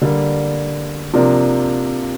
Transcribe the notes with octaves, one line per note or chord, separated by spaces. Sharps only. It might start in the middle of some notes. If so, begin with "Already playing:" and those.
D3 G3 A#3
C3 F3 A#3 D4